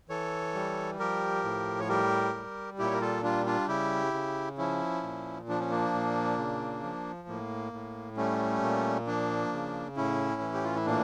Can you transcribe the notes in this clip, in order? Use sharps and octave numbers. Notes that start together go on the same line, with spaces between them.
E3 A4 C#5
G3
F3 G4 A#4
A2
C#5
G3 G4 A#4
G3
A#2 E4 G4
C#5
A#4
F4 A4
G3 D4 F4
D4 F4
C#3 E4 G4
C#3
F3 C#4 E4
A#2
F3 D4
C#4
A#3 D4
A#2
C#3
F3
A2 A#3
A2
G3 A3 C#4
A#2
F3 A#3 D4
C#3
A2 C#4 E4
E3
G4
F4
E4
A#2 A#3 D4